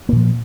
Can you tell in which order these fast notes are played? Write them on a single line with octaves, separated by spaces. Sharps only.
A#3 A#2 F3